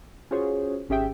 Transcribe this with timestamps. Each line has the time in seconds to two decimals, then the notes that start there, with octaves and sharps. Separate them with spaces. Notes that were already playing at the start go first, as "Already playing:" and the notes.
0.31 C#4 F4 F#4 G#4 C5 C#5
0.89 G#1 C#4 G4 G#4 E5 G5